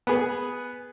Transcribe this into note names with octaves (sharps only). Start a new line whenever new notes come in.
B3 G#4 B4